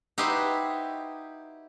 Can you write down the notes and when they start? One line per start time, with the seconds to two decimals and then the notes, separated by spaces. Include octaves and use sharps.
0.18 D#4 E4 F#4 G4 B4 C5